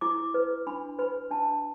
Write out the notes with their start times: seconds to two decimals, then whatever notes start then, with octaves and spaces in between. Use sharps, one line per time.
0.01 E4 D6
0.34 B4
0.67 D4 B5
0.99 B4 B5
1.31 D4 A5